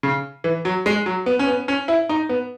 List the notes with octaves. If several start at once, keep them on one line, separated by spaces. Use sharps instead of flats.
C#3
E3
F#3
G#3
F#3
B3
C#4
B3
C#4
E4
D#4
B3